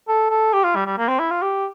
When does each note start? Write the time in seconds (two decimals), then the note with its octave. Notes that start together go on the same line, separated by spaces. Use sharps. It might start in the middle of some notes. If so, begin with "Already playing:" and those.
0.08 A4
0.30 A4
0.53 G4
0.64 F4
0.76 G3
0.86 G3
0.98 A#3
1.08 C4
1.19 E4
1.31 F4
1.42 G4